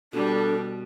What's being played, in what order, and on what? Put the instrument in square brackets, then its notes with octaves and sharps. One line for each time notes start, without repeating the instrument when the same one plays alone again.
[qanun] B2 [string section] G3 [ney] D4 [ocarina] A4